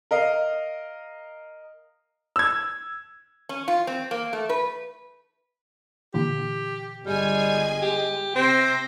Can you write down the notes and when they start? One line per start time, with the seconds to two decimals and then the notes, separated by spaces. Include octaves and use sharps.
0.11 A#4 D#5 F5
2.36 E6 G#6
3.49 C#4
3.68 F4
3.87 C4
4.11 A#3
4.33 A3
4.49 B4
6.14 A#2 D3 E3 G4
7.06 G1 G3 G#3 G#4 G#5
7.82 G4
8.36 C3 C4 C5 A#6